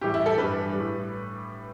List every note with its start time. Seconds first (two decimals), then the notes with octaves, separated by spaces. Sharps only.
0.01 A2 E3 G3 G4
0.14 E4
0.26 A4
0.37 G2 E3 G3 B4
0.73 G3
0.79 A2